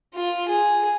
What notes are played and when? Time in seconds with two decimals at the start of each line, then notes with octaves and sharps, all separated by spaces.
0.15 F4
0.49 G#4